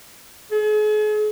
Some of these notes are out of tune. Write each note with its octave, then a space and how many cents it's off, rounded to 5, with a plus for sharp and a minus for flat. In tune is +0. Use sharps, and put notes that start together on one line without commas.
G#4 +40